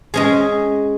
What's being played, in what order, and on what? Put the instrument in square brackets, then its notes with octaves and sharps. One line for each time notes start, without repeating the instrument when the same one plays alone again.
[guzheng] G#3 C#4 G#4